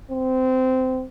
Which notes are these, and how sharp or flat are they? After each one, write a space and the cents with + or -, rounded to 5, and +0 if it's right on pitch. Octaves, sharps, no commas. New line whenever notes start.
C4 -20